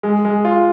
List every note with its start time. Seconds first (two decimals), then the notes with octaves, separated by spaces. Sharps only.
0.03 G#3
0.25 G#3
0.45 F4